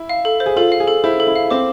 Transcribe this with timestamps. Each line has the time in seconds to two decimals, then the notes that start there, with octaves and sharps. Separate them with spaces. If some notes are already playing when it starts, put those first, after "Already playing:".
Already playing: E4
0.09 F5
0.25 A4
0.40 C5
0.46 G#4
0.56 F4 A4
0.72 F5
0.80 G#4
0.88 A4
1.04 E4 C5
1.20 A4
1.27 E4
1.35 F5
1.51 C4 D6